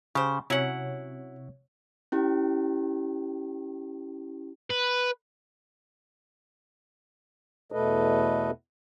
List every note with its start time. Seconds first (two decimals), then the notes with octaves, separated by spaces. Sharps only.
0.15 C#3 G4 C5
0.50 C3 F#3 C#4 E4 C#5 F#5
2.12 C#4 E4 G4
4.70 B4
7.72 E2 B2 A3 A4 B4 D#5